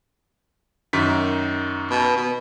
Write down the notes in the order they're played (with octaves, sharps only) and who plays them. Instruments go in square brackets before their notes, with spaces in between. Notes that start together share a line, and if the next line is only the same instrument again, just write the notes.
[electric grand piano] F#2 D#3 B6
[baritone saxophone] B2
B2